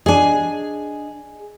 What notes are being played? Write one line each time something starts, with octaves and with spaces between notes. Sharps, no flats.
D4 G#4 D#5 G#5